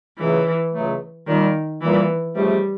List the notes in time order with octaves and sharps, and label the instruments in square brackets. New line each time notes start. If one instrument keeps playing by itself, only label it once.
[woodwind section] C#2 C#3 F#3 A3 [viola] E3
[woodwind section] C#2 C#3 F#3 A3
[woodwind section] A#2 G3 A#3 [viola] D#3
[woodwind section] A#2 G3 A#3 [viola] E3
[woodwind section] C#2 C3 F3 A3 [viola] G3